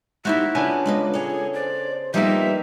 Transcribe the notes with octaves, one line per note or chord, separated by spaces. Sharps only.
A3 D#4 E4 F#4 G4 C5 E5
C#3 B3 D4 F4 G#5
G#3 A#3 B4 D#5
G#4 A4 C#5
C5 D5
F3 G3 A#3 B3 D#4 G4 B4 E5